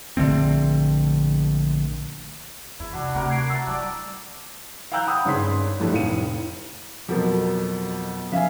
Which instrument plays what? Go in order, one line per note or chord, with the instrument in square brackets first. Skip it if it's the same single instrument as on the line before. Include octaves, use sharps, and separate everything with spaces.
[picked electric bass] A#1 D3 A3 C4
[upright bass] E2 [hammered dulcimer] E4
[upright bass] C2 [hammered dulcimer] D4 F#4
[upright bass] D2 C3 [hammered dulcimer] F#4 A#4
[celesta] G#6 C7 D7
[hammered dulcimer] A3 [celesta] E6 A6
[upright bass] G3 [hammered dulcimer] D5 G5 A5
[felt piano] F5 G5 A#5 E6 F#6 G6
F#5 B5 D#6 E6
G#1 G2 C#3 C#5 C6 B6
A2 F3 G3 A3 D4
F1 A2 F5 C#7 D#7
[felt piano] F2 B2 F3 [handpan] F#3 A4 A#4
[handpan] F3 C#4 F5 [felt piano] E5 G#5